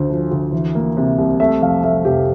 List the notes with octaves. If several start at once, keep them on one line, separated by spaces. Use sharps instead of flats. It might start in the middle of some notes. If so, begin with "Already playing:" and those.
Already playing: D2 D3 C5
F3
D2
E3
A#3
C3
C2
A3 E5
F2 F5
A3 E5
F1 G4